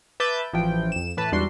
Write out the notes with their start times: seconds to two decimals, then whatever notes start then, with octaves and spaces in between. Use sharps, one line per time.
0.20 B4 E5 A5 D6 G6 A6
0.53 A1 E3 F3 G5
0.92 F2 E7
1.17 A2 E3 B4 A5
1.32 E2 G#2 G3 D4 F#4 C6